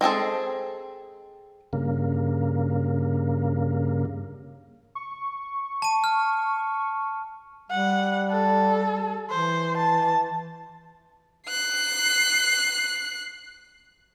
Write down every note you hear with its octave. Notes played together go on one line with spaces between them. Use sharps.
G#3 C4 G#4 A4
G2 C#3 A#3
C#6
A5 D#7
F6
G3 F#5
A4
E3 C5
A5
F#6 C7